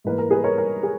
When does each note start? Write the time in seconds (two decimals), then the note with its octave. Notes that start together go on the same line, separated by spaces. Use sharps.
0.04 G#2 E3 A#3 B4
0.18 A#4
0.30 G#4 B4
0.44 A#4 C#5
0.58 A#4
0.83 G#4